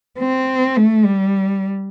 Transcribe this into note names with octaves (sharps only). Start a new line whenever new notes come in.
C4
A3
G3